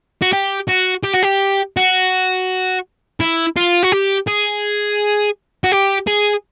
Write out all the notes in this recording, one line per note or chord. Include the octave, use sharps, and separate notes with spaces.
F#4
G4
F#4
G4
F#4
G4
F#4
E4
F4
F#4
G4
G#4
F#4
G4
G#4